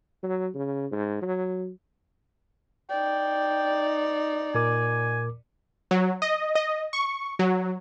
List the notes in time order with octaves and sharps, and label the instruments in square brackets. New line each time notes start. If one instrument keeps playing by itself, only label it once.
[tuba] F#3
C#3
G#2
F#3
[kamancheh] D#4 D5 [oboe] G5
[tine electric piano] A#2 A#4 D6 [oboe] G#5
[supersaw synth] F#3
D#5
D#5
C#6
F#3